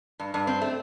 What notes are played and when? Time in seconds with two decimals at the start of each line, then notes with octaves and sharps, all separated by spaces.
0.19 G2
0.34 G2
0.47 C4
0.61 A3